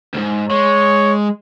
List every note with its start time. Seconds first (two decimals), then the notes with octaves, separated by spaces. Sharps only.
0.14 D2 G#2
0.51 G#3 C#5